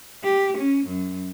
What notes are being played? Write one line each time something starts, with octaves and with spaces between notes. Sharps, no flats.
G4
C#4
F#2